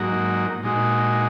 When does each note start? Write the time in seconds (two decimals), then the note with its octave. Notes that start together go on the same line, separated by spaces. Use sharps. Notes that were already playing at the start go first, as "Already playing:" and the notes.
Already playing: G#2 F#3 A#3 D#4 F#4
0.63 A#2 G#3 D#4 F#4